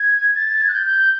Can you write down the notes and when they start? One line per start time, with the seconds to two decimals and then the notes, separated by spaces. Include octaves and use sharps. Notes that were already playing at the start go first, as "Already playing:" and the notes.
Already playing: G#6
0.36 A6
0.49 A6
0.61 G#6
0.69 F#6
0.74 G6
0.86 G6